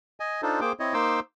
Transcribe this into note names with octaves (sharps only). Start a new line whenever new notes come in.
D#5 G#5
D4 D#4 F4 A4 C5
A#3 G#4 C5 G5 D6
C4 E4 C#5 D#5
A#3 D#4 C5 C6 D6 E6